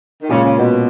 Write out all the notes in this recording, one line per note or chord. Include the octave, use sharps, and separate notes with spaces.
D#3
A#2 C#3 G#3 C#4 F4
C#3
B2